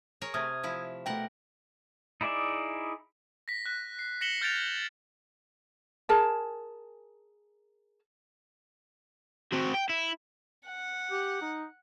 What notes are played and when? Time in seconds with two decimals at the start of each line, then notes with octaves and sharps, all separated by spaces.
0.21 G#4 A#4 C#5
0.34 C3 A3 D#6 F6 G#6
0.63 F3 E4
1.06 B2 A3 A#4 F#5 G5
2.21 D#4 E4 G#4 D5 E5
3.48 A#6 B6
3.66 F#6 B6
3.99 C7
4.21 A#6 B6 C#7 E7 F#7 G7
4.41 F6 G6 A6 A#6 D7 F7
6.09 G#4 A#4 G#5 A5
9.53 C4 F#4
9.74 G5
9.90 E4
10.66 F#5
11.11 G4
11.42 D#4